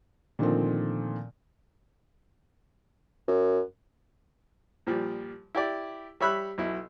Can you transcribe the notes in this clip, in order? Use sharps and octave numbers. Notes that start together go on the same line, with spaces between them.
A#2 D3 D#3 F3 A3 C4
F#2
A#2 F3 G3
E4 G4 D5
G3 C#5 E5 B5 E6 F#6
B1 B2 E4